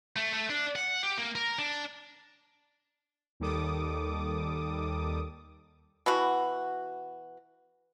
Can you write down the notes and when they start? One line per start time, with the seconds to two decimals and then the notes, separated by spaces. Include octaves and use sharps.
0.16 A3
0.34 A3
0.50 D4
0.76 F#5
1.03 G4
1.18 A#3
1.35 A#4
1.59 D4
3.40 D#2 D#3 G3 A4 D6 D#6
6.06 B2 E3 F#4